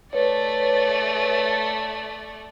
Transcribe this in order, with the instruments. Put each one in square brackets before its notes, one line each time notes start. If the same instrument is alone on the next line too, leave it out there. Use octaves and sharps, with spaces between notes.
[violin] A3 D5 [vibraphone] B4 C#5